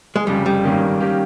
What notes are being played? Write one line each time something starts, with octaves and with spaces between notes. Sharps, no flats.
G#3
F1 F2 C#3 G3
G3
G#1 G2 D#3 A#3 C#4
D#3 A#3 C#4 G4